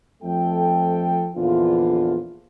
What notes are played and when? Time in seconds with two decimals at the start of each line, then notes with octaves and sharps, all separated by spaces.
0.23 F2 F3 A3 A4 G5
1.36 A#1 E2 D3 E3 F4